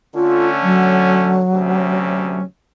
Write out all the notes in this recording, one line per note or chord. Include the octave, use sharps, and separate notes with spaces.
D3 A3 C#4 F4
F#3
D2 C3 C#4